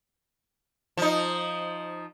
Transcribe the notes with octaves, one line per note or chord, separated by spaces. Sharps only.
F3 D#4